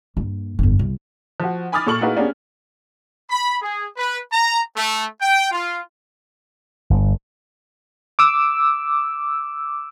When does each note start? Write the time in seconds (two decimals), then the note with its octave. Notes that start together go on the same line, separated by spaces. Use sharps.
0.17 G2 A#3
0.59 G1 F2
0.79 C2
1.40 F3 F#4
1.72 G#5 B5 D6 D#6 F6 A6
1.87 A#2 A4 C#6 F#7
2.01 A#3 D#4 E4 F#4 G#4 B4
2.16 A#3 B3 C#4 D4 G4 G#4
3.30 B5
3.61 G#4
3.97 B4
4.33 A#5
4.76 A3
5.21 G5
5.51 F4
6.90 G1
8.19 D6 E6